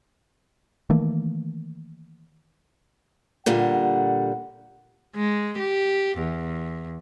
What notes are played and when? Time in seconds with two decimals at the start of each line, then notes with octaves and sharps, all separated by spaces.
0.90 D#3 E3 A3 A#3
3.46 A#2 D3 G3 F#5
5.16 G#3
5.59 G4
6.18 E2